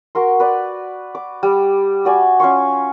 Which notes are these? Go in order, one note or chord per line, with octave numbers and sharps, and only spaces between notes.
F#4 A#4 C6
B4 D5
D6
G3
F#4 D5 G#5
C#4 F4 C6 C#6